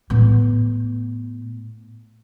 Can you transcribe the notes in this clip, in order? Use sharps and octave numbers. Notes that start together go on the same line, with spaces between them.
A2 B3